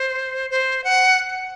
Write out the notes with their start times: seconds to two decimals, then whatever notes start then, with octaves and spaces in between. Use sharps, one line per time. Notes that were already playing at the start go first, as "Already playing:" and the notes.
Already playing: C5
0.50 C5
0.84 F#5